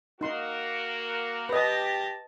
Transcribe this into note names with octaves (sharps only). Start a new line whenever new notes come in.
A#3 D#4 F#4 A#4 C6
G4 B4 D#5 A5 A#6